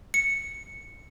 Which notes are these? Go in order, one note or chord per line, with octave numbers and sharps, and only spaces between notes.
C#7